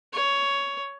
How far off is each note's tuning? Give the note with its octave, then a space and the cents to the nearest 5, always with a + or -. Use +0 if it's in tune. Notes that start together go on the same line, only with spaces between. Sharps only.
C#5 +10